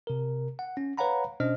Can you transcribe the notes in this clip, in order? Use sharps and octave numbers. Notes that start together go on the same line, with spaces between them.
C3 A#4
F#5
C#4
B4 C#5 F5 F#5 A#5 B5
B2 C#4 D4 C5 D#5 F6